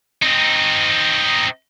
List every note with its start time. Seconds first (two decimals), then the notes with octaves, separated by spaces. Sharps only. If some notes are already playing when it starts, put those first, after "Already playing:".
0.23 C4 D#4